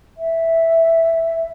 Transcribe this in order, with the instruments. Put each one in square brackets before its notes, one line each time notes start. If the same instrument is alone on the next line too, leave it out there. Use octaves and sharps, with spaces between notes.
[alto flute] E5